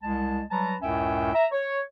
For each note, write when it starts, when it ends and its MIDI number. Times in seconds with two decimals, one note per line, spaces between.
0.03 0.42 36
0.03 0.42 56
0.03 0.42 81
0.51 0.75 54
0.51 0.75 55
0.51 0.75 71
0.51 0.75 81
0.51 0.75 82
0.81 1.32 37
0.81 1.32 42
0.81 1.32 45
0.81 1.32 61
0.81 1.32 76
0.81 1.32 79
1.34 1.46 76
1.34 1.46 82
1.52 1.81 73